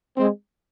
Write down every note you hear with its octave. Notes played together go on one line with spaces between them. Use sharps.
G#3 C4